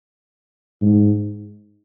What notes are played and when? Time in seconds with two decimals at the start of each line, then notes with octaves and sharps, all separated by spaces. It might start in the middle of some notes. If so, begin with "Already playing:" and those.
0.82 G#2